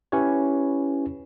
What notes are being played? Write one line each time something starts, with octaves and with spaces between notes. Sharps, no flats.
C#4 E4 G4 B4 C#5